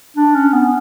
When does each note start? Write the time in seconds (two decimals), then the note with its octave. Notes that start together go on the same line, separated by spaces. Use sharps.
0.17 D4
0.35 C#4
0.53 B3